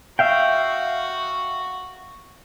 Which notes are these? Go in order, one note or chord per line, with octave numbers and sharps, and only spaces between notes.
F#4 E5 F5 G5